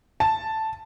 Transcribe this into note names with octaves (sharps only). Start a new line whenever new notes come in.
A5